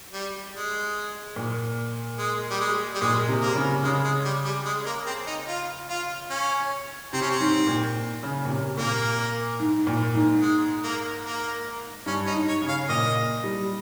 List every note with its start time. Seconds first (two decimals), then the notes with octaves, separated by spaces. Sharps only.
0.13 G3
0.53 G#3
1.36 A#2
2.18 G#3
2.50 G3
2.60 G#3
2.95 G3
3.01 A#2 G#3
3.28 C3
3.42 A#3
3.55 C#3
3.83 C#3 G#3
4.04 G#3
4.25 G3
4.45 G3
4.65 G#3
4.86 A#3
5.06 C4
5.27 D#4
5.48 F4
5.89 F4
6.30 C#4
7.13 C3 C4
7.22 C#4
7.31 C4
7.40 G#2
7.67 A#2
8.23 C#3
8.45 A#2
8.50 C3
8.78 A#2 A#3
9.60 G#2
9.87 A#2
10.14 G#2
10.42 G#3
10.84 A#3
11.24 A#3
12.06 G2 C#4
12.27 D#4
12.34 G#2
12.48 C#5
12.62 C#3
12.68 F5
12.89 A#2 D#5
13.44 G3